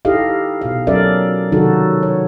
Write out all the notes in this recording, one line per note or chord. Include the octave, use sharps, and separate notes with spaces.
D#4 E4 G4 A4 D#5 F5
B2 F5
F#3 C#4 A4 A#4 D5 E5
C3 D#3 F#3 D#4 F#4 A4
C#5